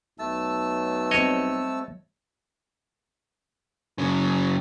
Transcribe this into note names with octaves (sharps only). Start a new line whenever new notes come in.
B1 A3 A5 E6
G3 C4 C#5 D#5
F#2 C#3